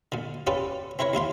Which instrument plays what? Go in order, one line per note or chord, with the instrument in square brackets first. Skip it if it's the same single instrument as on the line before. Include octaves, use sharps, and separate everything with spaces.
[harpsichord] A#2 D3
C#4 F4 G4 A4 B4 D5
C4 E4 A#4 B4 C#5
D#2 E4 F4 C6